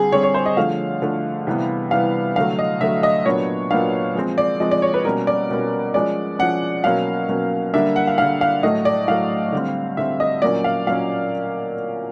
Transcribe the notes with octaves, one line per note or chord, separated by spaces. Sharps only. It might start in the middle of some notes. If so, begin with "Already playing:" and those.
Already playing: D3 G3 C4 G#4
D3 G3 C4 C#5
C#5
C5
D#5
D3 F3 A3 F5
D3 F3 A3
C3 E3 G3 B3
C3 E3 G3 B3 F5
D3 F#3 A3 F5
D#5
D3 F#3 A3 E5
D#5
A#2 F#3 B3 D4 C#5
A#2 F#3 B3 D4 F5
F3 G#3 C4
D5
F3 G#3 C4 D#5
D5
C#5
B4
B2 G3 A#3 C#4 A#4
D5
B2 G3 A#3 C#4
F3 G#3 C#4 D5
F3 G#3 C#4 F#5
B2 F#3 A#3 C#4 F5
B2 F#3 A#3 C#4
D3 G3 A#3 D4 E5
F#5
F5
D3 G3 A#3 D4 F5
F5
A2 F#3 A3 D#5
D5
A2 F#3 A3 F5
D3 G3 C4
D3 G3 C4 E5
D#5
A#2 F#3 A#3 C#4 D5
F5
A#2 F#3 A#3 C#4 F5